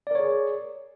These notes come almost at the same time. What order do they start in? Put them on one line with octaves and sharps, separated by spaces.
D5 A#4 C#5 G#4